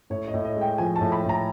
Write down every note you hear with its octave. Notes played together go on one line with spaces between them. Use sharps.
A2 C#5
D#5
A2
D#5
G#3
G5
F3 G#5
A5
A2
B5
A2 A#5